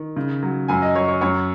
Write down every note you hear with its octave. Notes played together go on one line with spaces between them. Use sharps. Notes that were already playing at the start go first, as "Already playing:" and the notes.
Already playing: D#3
C#3
F#3
F#2 G#5
D#5
F#3 C#5
C#5
F#2 C#5